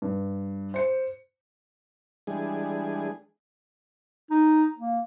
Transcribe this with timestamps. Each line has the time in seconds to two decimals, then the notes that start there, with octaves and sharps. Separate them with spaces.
0.02 G2
0.74 C5 C#7
2.27 E3 G3 G#3 D4 G#4
4.31 D#4
4.78 A#3